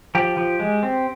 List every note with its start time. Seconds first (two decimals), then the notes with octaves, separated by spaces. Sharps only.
0.15 F3 G4
0.37 F3
0.60 G#3
0.83 C4